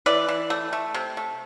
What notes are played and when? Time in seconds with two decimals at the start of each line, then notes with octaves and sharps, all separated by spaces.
0.06 E3 B4 D5
0.28 E3
0.50 A3
0.73 A3
0.94 C3
1.17 A3